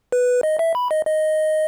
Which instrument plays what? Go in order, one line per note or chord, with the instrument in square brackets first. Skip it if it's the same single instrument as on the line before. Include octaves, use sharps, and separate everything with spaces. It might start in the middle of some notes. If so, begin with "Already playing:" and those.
[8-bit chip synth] B4
D#5
E5
B5
D#5
D#5